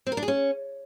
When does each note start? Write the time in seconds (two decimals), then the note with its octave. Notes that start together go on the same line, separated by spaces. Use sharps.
0.07 C4
0.12 A#4
0.17 D4
0.23 G#4
0.28 C#4